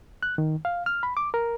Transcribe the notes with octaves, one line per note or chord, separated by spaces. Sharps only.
F#6
D#3
F5
F6
B5
D6
A#4